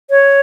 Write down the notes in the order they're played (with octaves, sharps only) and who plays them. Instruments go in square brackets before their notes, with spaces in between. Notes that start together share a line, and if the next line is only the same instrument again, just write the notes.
[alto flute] C#5